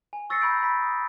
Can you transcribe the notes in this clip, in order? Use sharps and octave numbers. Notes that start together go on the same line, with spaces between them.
G#5
C#6 E6 A6 A#6 C7 C#7
A#5 B5 C#6 E6 G6 D7
B5 B6
D#6